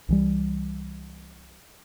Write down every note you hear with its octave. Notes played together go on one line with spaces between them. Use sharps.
C2 E3 G3